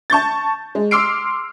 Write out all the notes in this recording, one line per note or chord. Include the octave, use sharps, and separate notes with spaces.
A5 C#6 G6 A6
G#3
C6 D6 E6 F6 C7 D7